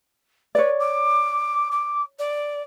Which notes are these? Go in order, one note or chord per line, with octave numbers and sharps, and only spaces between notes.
B4 C#5 D5
D6
D6
D5